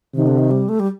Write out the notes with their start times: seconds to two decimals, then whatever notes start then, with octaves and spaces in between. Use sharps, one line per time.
0.14 C3 D#3
0.27 D3
0.38 D#3
0.51 G3
0.69 A3
0.80 G3